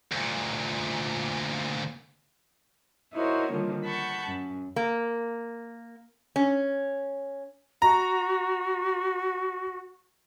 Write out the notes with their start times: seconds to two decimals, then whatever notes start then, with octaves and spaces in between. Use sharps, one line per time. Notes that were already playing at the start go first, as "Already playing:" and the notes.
0.12 D2 A#2
3.13 D#4 E4 F#4 A#4 C5 C#5
3.52 D3 D#3 F3 G3 A#3
3.84 F#5 A5 B5 C#6 G6
4.26 F#2
4.76 A#3
6.36 C#4
7.82 F#4 A#5